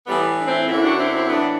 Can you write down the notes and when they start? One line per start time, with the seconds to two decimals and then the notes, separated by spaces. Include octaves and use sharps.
0.06 A2 E3 G3 B3
0.39 D4
0.47 C4 E4
0.68 F#2 D3 C4 E4
0.83 D4 F#4
0.98 C4 E4
1.14 C4 E4
1.29 A2 E3 B3 D4